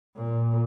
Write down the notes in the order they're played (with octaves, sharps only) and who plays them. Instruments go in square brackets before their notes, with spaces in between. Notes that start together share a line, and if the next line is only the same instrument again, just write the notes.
[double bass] A#2